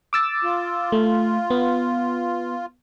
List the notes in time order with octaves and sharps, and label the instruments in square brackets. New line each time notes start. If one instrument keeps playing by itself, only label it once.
[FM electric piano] D6 E6 A6
[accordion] F4
[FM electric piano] A3
B3